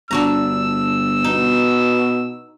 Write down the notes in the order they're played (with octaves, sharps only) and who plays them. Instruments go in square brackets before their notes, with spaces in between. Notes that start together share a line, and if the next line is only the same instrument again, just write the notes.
[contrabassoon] G1 [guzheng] D4 F#4 A#5 [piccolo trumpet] E6
[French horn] B2 [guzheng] D#4